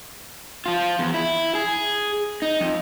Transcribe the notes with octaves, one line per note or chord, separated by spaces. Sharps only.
F3 F4
E2
E4
G#4
D#4
F2